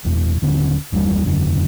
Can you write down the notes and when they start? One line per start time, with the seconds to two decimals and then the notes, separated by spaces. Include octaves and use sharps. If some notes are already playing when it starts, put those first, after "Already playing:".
0.05 F#1 E2
0.42 D#1 D3 B3 C#4
0.92 F#1 D#2 D3 G3
1.24 E1 F#2 D3